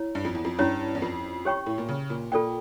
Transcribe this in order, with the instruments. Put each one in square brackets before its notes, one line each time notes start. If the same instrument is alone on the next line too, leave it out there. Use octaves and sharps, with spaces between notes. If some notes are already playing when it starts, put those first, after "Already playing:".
Already playing: [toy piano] E4 C#5
[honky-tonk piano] G2
F2
E2
F2
[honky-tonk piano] G2 [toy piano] C#4 E4 G4 C#5
[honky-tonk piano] E2
F2
[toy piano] G4 C#5 G5 C#6
[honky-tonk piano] A2
A#2
C#3
A#2
[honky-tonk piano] A#2 [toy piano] F4 A4 D5 G5